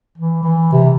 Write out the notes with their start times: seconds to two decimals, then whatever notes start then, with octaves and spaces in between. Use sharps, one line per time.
0.18 E3
0.43 E3
0.72 C3